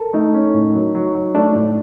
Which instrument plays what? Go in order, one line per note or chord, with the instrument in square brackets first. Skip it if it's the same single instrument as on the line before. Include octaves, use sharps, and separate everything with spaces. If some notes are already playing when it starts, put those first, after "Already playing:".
Already playing: [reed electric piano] A4 A#4
[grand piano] A3 [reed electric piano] D#4
[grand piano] C#4
A2
F#3
F#3
F#3
[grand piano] A3 [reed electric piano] D4
[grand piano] A2